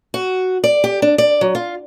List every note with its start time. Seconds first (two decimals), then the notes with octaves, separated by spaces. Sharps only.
0.14 F#4
0.64 D5
0.84 G4
1.02 D4
1.18 D5
1.41 F#3
1.55 F4